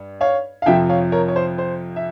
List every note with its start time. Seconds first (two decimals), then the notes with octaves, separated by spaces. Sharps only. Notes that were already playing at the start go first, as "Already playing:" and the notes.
Already playing: G2
0.21 C#5 F5
0.62 F5
0.66 F2 C3 F3 E5 G5
0.89 C#5 F5
1.12 A#4 C#5
1.28 C#5
1.36 C5
1.58 C5
1.96 E5